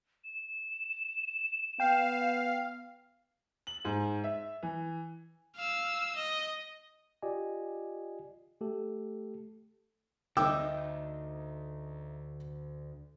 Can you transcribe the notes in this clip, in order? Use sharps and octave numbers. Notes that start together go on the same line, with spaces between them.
E7
B3 F5 G5
F#7
G#2
E5
E3
F5 E6
D#5
F4 G4 D5 D#5 G#5
A3 G4 A4
D2 A3 D#4 D#5 G5 D6 E6